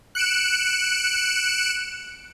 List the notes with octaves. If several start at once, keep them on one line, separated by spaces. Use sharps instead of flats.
F#6 C#7 D7 E7